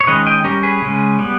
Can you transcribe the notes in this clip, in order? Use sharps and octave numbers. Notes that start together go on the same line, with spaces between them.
C#5
D#3 G#3 C#4 B4 D#5
D#5 G5
G3 C#4 G4 A#4
G#4 B4
C#3 G#3 C#4
G3 B3